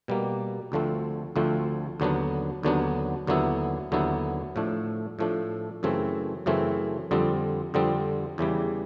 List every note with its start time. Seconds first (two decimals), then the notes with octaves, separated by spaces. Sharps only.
0.08 B2 G3 A#3
0.72 D2 D3 F3 A3 C4
1.36 D2 D3 F3 A3 C4
2.00 D#2 D3 F#3 B3 D4
2.63 D#2 D3 F#3 B3 D4
3.27 D#2 D3 F#3 B3 E4
3.92 D#2 D3 F#3 B3 E4
4.56 A2 F3 A3 D4
5.19 A2 F3 A3 D4
5.83 F#2 C#3 E3 A3 C4
6.46 F#2 C#3 E3 A3 C4
7.11 F2 D3 G3 C4
7.74 F2 D3 G3 C4
8.38 E2 C#3 E3 G3